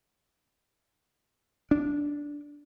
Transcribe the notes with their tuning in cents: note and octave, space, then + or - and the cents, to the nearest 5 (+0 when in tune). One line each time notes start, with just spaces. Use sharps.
D4 -10